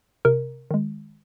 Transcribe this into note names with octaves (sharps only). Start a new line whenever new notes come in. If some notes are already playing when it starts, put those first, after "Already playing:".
C3 A#4
D#3 G#3